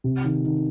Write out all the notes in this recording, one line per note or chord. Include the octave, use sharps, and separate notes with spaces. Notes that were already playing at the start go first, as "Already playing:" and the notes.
C3
D#3
D#3